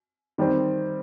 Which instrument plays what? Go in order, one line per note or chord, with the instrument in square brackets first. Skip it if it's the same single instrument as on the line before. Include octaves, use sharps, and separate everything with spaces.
[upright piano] D#3 G3 C4